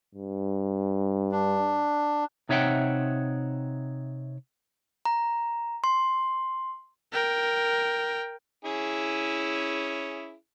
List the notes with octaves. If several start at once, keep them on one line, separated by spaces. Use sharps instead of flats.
G2
D4
C3 D#4 C#5 E5 F#5 G5
A#5
C6
A#4 G5
C#4 E4 G#4